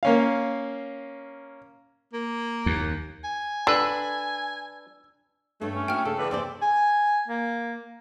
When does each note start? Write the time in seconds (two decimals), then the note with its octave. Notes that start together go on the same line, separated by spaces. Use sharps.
0.03 A#3 C#4 F5
2.13 A#3
2.66 D#2
3.24 G#5
3.67 D3 D4 B4 E6
5.61 G2 A3 C#5
5.75 C#4
5.88 E4 F#4 G5 F6
6.05 C#3 A4
6.19 E2 D4 B4
6.31 E2 C3 C4 C5 D5
6.62 G#5
7.28 A#3